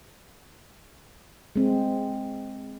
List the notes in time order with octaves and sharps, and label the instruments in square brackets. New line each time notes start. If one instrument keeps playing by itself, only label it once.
[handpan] G#3 C4